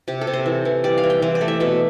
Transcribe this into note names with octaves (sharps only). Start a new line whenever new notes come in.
C3 G4
A4
C3
C5
E3
E3
G3 D5
F5
E3
G5
E3 C5
D5
A3
E5
B2 E5